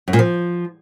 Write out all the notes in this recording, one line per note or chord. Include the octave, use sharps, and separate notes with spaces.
F#2
A#2
F3